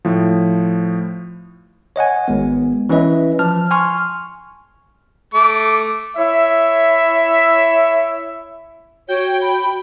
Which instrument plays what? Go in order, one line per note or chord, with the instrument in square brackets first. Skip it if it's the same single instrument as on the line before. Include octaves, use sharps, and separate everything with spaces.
[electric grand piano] A2 F3
[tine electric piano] C#5 D#5 F#5 G#5
G#1 G#3 B3
E3 C#4 E4 B4 D#5 E5
F3 A5 F6
G#5 C6 C#6 F6
[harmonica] A3 D6
[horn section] E4 C#5 E5
[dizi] F#4 [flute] C#5 [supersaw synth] G5
[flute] B5